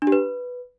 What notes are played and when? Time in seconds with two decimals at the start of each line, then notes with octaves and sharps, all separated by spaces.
0.02 D4
0.07 G4
0.12 B4